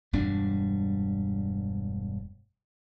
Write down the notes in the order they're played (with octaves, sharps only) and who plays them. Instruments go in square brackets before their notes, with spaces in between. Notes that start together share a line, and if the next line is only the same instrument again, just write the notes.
[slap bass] E1 G2 G3 D4